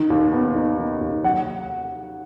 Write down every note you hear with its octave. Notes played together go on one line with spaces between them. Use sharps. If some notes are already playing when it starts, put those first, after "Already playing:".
Already playing: D#3
D#2
B3
D#4
D#3
D#2
F#3 F#5